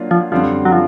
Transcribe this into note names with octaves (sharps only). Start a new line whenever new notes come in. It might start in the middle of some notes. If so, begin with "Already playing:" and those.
Already playing: F#3 A#3 D4 F4
F3
F#2 D3 F3 G3 C4
F#3
F3